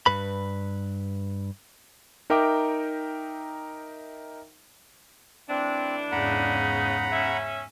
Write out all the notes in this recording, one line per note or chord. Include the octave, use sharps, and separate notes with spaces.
G2 B4 B5
D#4 A#4 E5 G5 D6
A2 E3 C4 D4
E2 G#2 C#3 F#5 A#5 B5
C#4 E5